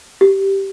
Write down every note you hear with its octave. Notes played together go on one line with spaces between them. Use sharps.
G4